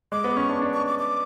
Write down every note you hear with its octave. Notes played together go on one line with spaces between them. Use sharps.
G#3 D6
B3
C#4 C#6
D4
D4
C#6
D6
D6